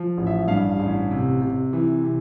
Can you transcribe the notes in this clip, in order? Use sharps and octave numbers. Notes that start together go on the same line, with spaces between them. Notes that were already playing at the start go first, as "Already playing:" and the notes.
Already playing: F3
A1
E5
G2 F5
A1
C3
C3
E3
C3